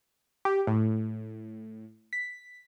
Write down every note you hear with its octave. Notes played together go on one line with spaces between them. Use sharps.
G4
A2
B6